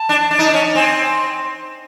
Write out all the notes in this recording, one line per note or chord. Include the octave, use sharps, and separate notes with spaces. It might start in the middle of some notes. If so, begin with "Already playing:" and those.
Already playing: A5
D4
D4
D#4
D4
C#4
C4 G#5